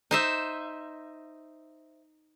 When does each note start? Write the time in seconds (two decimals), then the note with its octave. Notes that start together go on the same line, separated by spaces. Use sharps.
0.11 D#4 C5 E5